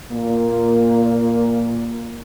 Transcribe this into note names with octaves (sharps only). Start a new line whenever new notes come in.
A#2 A#3